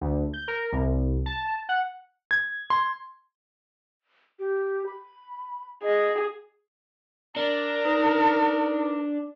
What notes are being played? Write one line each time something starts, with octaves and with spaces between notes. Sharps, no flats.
D2
G6
A#4
C2
A5
F#5
G#6
C6
G4
B5
G#4 D#5
D4 A#4
D#4 B4